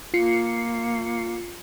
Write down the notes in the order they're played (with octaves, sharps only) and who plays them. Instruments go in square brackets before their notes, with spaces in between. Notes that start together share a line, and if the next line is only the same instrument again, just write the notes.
[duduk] A#3 [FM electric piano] F4 C7 C#7